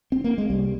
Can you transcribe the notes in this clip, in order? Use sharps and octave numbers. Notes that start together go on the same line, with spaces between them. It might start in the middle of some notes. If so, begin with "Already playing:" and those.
C4
A#3
G#3
C2 G3